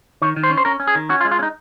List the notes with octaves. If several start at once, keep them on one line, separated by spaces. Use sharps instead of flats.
D#3 C#5
D#3
C5
C#4
C5
C#4 A#4
C#4
G#4
D#3
C#4 F#4
F4
G#3
F4
C#4
D#4